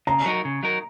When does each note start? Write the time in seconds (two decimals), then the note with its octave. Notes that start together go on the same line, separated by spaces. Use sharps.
0.07 C#3 A#5
0.26 F#3 D#4 A#4
0.45 C#3
0.63 F#3 D#4 A#4